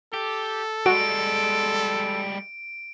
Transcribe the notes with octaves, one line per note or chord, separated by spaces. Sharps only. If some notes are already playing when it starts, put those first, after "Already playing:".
G4 A4
G3 G#3 F#4 D7